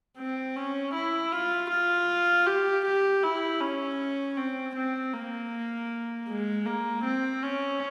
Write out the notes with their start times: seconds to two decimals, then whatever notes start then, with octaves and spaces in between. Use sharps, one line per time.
0.18 C4
0.56 C#4
0.94 E4
1.32 F4
1.70 F4
2.47 G4
2.85 G4
3.23 E4
3.61 C#4
4.37 C4
4.76 C4
5.14 A#3
6.28 G#3
6.66 A#3
7.04 C4
7.43 C#4